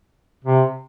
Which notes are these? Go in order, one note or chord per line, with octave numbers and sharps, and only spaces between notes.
C3